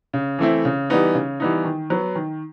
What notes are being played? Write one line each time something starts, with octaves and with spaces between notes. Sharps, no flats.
C#3
E3 A3 C4 E4
C#3
E3 G3 B3 D#4
C#3
E3 G3 B3 D#4
D#3
F#3 B3
D#3